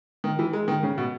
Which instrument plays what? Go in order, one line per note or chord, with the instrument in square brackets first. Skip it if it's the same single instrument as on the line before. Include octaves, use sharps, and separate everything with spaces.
[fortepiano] D#3
E3
G#3
D#3
C#3
B2